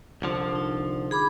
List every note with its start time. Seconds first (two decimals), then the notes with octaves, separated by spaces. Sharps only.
0.22 C2 D3 F3
0.56 D#4
1.11 G#4 B5 D6